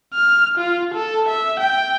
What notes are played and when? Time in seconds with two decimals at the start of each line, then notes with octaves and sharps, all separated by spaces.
0.14 F6
0.58 F4
0.94 A4
1.29 E5
1.60 G5